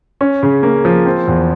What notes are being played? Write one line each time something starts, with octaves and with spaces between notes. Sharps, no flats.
C#4
C#3
A#3
F3
C4
E2